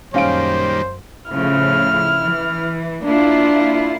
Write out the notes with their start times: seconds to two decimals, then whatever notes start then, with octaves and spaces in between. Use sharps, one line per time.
0.14 F#2 A#2 D#3 G3 C#4 C5 F5 D7
1.31 A2 C#3 F3 E4 F6
2.22 E3
3.05 A#3 D4 E4 F4